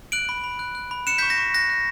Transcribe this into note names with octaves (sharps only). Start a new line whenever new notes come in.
F#6 D7 F#7
B5
B5
F#6
F#6
B5
F#6 C#7 E7
G6 B6
C#6
A#6
C#6
F#6 A#6
F#6